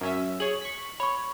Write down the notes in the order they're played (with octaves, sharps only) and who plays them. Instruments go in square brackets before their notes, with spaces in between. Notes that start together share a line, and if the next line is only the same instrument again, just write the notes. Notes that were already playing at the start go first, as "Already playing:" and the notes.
[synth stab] F#2 C#4 E5
[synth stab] G#4 C#5 [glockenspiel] F#7
[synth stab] C#6 B6
[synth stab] C#5 [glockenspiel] B5 C#6